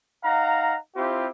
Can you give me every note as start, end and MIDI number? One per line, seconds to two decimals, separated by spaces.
0.24 0.73 63
0.24 0.73 77
0.24 0.73 78
0.24 0.73 82
0.96 1.27 60
0.96 1.27 64
0.96 1.27 65
0.96 1.27 67